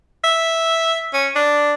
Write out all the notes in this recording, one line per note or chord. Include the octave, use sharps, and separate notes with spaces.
E5
C#4
D4